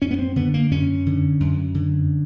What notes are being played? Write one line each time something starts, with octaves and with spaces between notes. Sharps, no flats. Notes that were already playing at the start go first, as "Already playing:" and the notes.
F#2 C#4
B3
C4
D3 B3
A#3
F#2 C#4
D3
F#2
D3